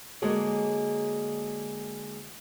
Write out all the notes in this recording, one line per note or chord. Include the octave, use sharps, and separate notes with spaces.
D3 G#3 A#3 F#4 G#4 C#5